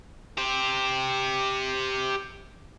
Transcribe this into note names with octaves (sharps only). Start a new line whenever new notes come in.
G4 C5